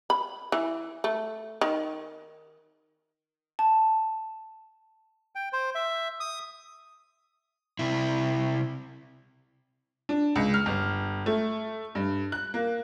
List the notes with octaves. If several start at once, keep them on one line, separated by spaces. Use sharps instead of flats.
B5
E3
A3
D#3
A5
G5
C5
E5
D#6
C3 E4
D4
C#2
F6
G1
A3
G2
F#6
A#3